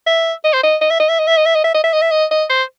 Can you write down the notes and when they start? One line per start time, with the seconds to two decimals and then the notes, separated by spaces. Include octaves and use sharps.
0.06 E5
0.44 D#5
0.53 C5
0.63 D#5
0.81 D#5
0.90 E5
1.00 D#5
1.09 E5
1.19 D#5
1.27 E5
1.37 D#5
1.46 E5
1.55 D#5
1.64 E5
1.75 D#5
1.84 E5
1.93 D#5
2.02 E5
2.11 D#5
2.31 D#5
2.50 C5